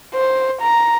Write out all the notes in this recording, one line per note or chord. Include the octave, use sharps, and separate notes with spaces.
C5
A#5